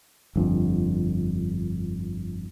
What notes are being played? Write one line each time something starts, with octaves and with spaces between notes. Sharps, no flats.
G1 F2